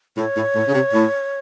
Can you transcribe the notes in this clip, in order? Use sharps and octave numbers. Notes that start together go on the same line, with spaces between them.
A2 C#5
A2
A2
C#3
C3
A2